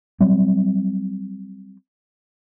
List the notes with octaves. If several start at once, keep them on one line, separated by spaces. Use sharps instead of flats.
F#3 G3 C4